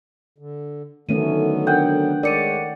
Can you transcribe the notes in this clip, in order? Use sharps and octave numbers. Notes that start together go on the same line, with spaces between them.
D3
D3 D#3 F#3 A3 B3 C#4 D#7
D4 A#4 F#5 G5
G#3 A#4 C#5 D5 C#7 D#7